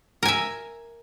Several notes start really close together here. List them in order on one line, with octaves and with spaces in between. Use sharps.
A#4 G#5 E5